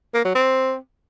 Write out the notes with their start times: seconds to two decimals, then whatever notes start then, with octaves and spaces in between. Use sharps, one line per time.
0.14 A#3
0.25 F#3
0.35 C4